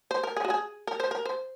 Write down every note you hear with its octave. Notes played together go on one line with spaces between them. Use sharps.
C5
A#4
G#4
F#4
G#4
A#4
C5
A#4
C5